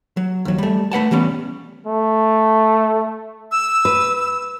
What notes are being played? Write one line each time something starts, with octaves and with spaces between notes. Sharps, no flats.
F#3
D#2 F#3
G3 A3
A3 B4 F#5 A5
E3 G3 B3 C#4
A3
E6
B4